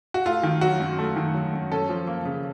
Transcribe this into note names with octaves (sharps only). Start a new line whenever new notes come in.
F#4
A3 F4
D#3
F#3 F#4
F#2
A3
D#3
F#3
F#2
C#4 A4
F3
A#3
C#3